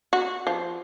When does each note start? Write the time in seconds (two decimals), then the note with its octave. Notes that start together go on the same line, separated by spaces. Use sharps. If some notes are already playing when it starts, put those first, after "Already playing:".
0.13 F#4
0.47 F3